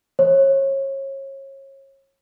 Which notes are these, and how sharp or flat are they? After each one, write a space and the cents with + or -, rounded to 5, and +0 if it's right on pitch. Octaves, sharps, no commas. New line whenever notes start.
C#5 -30